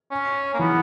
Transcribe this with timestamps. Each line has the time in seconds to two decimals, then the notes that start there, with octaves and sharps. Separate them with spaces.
0.11 C#4
0.54 A#3
0.59 E3 B3